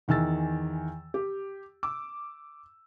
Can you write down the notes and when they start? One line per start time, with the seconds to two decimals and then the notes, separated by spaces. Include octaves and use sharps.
0.08 E2 D#3 E3 G#5 E6 A6
1.14 G4
1.83 D6 E6